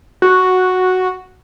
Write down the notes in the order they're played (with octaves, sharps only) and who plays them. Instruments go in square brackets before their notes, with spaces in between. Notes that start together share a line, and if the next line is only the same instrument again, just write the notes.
[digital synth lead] F#4